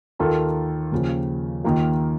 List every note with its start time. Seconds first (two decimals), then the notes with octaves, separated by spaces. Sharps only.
0.19 D#2 D#3 A#3 F4 A4
0.92 D#2 C#3 F3
1.64 D#2 D#3 A#3 F4